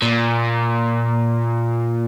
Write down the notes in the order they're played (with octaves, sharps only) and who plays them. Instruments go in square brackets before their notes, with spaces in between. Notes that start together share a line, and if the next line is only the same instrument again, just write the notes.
[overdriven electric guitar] A#2